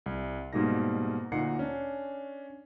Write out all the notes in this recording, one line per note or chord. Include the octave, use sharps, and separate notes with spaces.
C2
G#2 B2 G3 A#3 D#4 A#6
D2 A#2 D#4 F#5 C7 C#7
C#4 D4